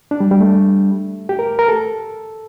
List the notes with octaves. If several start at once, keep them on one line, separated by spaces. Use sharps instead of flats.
D4
G3
G3
A3
G4
A#4
A#4
A4